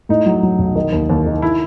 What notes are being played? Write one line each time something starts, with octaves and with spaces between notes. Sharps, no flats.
A2 D#4
F#3
F#3
B1
D#3
D#2
D#2
D#3
E4